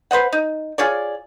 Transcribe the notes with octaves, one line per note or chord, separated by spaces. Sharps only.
B4 C5 D#5 F#5
D#4
F4 G#4 C#5 D5